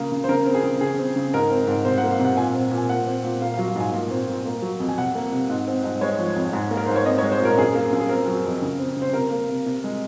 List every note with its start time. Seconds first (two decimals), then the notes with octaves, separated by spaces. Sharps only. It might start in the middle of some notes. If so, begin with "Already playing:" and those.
Already playing: C#3 A#3
0.12 C#3
0.24 C5
0.29 C#3 A#4
0.46 C4
0.54 G#4
0.64 C#3
0.81 C#3 G#4
0.99 C4
1.16 C#3
1.33 G#2 A#4
1.51 C4
1.67 G#2
1.85 C3 C5
1.98 F#5
2.03 A#3
2.11 F5
2.19 C3
2.25 F#5
2.37 A#2 G#5
2.54 C4
2.71 A#2
2.77 G#5
2.89 A#2 F#5
3.06 C4
3.24 A#2
3.41 A#3 F5
3.54 F5
3.59 F#3
3.67 F5
3.75 G#2 G#5
3.93 A#2
4.11 C4
4.29 A#2
4.45 A#3
4.62 F#3
4.80 F2
4.89 G#5
4.98 C3 F#5
5.15 A#3
5.33 C3
5.50 G#2
5.68 C4
5.84 G#2
6.01 G#3 C#5
6.19 F3
6.36 F2
6.53 G#2
6.71 A#3
6.77 A#4
6.86 G#2 C5
6.96 C#5
7.05 C4 D#5
7.18 C#5
7.23 G#3
7.32 C5
7.40 A#2
7.45 A#4
7.57 F#2 G#4
7.75 A#3
7.92 F#2
8.00 G#4
8.09 C4 A#4
8.27 F#3
8.45 F2
8.62 C#3
8.79 C4
8.96 C#3
9.02 C5
9.13 C3 A#4
9.31 A#3
9.49 C3
9.66 C3
9.84 G#3